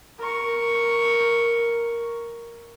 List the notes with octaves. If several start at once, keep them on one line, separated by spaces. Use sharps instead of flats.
A#4 C#6